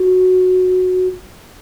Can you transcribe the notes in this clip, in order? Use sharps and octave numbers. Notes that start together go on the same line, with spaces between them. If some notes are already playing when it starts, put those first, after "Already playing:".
Already playing: F#4